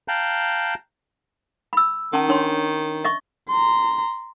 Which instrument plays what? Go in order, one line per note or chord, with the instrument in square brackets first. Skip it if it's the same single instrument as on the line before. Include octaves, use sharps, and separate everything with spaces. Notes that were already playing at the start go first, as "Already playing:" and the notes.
[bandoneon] F5 G5 A5 A#5 F#6 G6
[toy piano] B5 E6
[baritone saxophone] D#3 [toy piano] C#4 A5
[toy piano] D4 C#5 C6
D#5 E5 C#6
[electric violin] A#5 C6